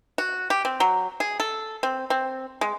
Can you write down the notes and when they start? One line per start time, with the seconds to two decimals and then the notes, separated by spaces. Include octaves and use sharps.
0.18 F#4
0.50 G4
0.65 C4
0.80 F#3
1.20 G#4
1.40 A4
1.83 C4
2.10 C4
2.61 G#3